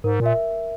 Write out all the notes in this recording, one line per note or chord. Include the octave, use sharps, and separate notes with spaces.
G#2 A#4
A#2
E5